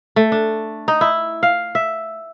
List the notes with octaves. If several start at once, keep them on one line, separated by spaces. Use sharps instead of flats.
A3
D4
D#4
E4
F5
E5